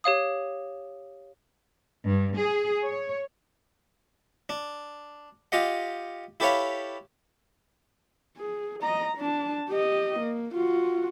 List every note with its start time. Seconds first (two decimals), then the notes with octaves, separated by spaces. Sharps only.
0.04 G4 C#5 F5 D#6
2.05 G2
2.38 G#4
2.85 C#5
4.49 D4
5.52 F4 G4 D#5 F#5
6.40 E4 G4 A4 B4 C#5 F5
8.37 G#4
8.82 D#5 A#5
9.17 D4 A5
9.69 G4 D#5
10.20 A#3
10.54 F4 F#4